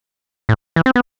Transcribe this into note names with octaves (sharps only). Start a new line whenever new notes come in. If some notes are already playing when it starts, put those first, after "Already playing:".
A2
E3
C4
B3